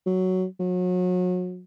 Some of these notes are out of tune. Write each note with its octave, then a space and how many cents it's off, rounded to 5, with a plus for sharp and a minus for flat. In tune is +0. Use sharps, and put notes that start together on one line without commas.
F#3 +5
F#3 -35